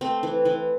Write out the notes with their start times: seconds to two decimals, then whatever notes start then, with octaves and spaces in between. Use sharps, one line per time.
0.01 A3 C4
0.23 E3
0.45 E3